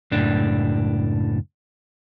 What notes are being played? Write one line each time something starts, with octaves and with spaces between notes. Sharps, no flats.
C#2 F#2 A2 D4